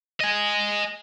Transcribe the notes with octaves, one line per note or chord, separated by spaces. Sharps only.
D#5 G#5